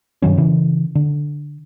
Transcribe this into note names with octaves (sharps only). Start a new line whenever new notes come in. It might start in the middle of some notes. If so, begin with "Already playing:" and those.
G2 D#3 F#3 C#4
C#3 E3
D3